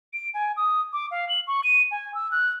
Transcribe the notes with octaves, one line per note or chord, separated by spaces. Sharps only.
D7
G#5
D#6
D6
F5
F#7
C#6
D#7
G#5
E6
F#6